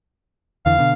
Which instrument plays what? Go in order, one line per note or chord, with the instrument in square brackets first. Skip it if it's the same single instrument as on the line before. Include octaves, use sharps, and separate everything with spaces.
[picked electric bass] E2 D3 E3 [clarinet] F5
[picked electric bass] B2 D3